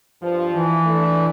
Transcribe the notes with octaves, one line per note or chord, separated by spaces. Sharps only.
G2 F3
E3
A3 D4 E4